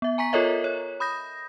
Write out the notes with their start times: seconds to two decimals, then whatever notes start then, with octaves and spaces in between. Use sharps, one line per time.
0.02 B3 E5
0.18 G#5 A#5 C#6 B6
0.33 F4 A4 A#4 C#5 D#5 E5
0.64 C#5
1.00 B5 D#6 G6 A#6